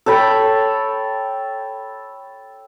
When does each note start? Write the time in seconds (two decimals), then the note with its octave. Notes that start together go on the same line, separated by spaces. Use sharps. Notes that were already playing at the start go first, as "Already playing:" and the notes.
0.06 A4 C#5 G5 B5